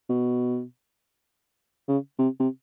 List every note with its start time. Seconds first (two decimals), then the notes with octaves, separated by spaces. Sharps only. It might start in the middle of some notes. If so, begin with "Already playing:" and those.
0.09 B2
1.88 C#3
2.19 C3
2.39 C3